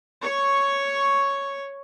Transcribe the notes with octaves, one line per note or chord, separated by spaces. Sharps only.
C#5 C#6